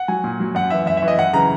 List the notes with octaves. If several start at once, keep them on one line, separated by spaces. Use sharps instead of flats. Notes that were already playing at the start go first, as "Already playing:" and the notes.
Already playing: F#5
F#3 G#5
A#2
F#3
F#2 F#5
E3 E5
F#2 E5
E5
E3
D#5
F#2 F#5
C#3 E3 A#5